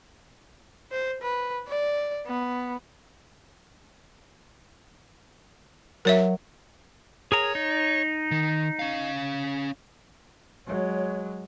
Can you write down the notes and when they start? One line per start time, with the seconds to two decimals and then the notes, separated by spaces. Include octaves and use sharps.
0.92 C5
1.22 B4
1.68 D5
2.27 B3
6.05 F#3 A#4 C#5 E5
7.32 G#4 A#4 C#5 A#5
7.55 D#4
8.31 D#3
8.79 C#4 F5
10.67 F#3 G#3 C#5